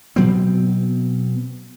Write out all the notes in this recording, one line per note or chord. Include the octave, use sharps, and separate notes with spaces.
B2 F#3 B3 C4